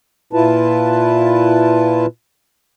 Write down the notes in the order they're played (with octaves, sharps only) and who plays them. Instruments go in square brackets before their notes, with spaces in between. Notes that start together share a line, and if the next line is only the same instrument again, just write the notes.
[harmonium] A#2 E4 F4 B4 A5